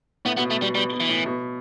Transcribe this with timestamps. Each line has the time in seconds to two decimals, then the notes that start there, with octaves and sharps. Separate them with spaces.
0.25 A2 B3
0.37 B2 B3
0.51 A3
0.62 B2 G3
0.75 B2 G3
0.92 B2
1.00 E3
1.09 A2
1.26 B2